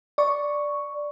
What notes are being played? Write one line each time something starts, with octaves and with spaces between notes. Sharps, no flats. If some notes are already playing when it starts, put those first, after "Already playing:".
D5 C#6